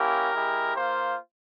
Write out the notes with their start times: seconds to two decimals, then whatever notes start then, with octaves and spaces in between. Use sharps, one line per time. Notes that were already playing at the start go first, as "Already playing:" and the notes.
Already playing: A#3 C#4 E4 G4 A#4
0.33 G#3 E4 G4
0.75 A#3 F4 C5